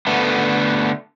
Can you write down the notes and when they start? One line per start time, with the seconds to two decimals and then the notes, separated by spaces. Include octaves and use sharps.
0.07 D3 A3 B3